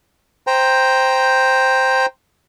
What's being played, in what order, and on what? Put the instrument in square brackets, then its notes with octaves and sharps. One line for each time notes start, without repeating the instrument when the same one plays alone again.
[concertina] C5 G5 A#5